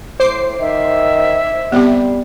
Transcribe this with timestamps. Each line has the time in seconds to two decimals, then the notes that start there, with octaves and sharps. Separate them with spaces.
0.20 A2 C5 D6 C7
0.60 D#3 E5
1.72 G3 B3 C4 G4